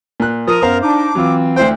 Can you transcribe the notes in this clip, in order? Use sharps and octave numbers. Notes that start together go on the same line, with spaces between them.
A#2 F#6
F3 A#4 D#6
F#2 B3 C5 F5 A#5
D4 D#4 D6
E3 F#3 C4 F4
D2 E4 C5 G5